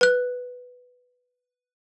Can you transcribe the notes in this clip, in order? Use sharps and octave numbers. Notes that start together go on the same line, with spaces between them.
B4 F#6